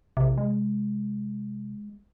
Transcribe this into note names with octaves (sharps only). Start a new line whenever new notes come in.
A#1 C3
G#3